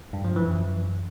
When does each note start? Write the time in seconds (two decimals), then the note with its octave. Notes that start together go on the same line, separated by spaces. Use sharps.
0.13 G2
0.25 F3
0.36 E3
0.47 F#2